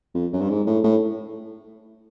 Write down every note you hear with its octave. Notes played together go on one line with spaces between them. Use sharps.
F2
F#2
G2
G#2
A2
A2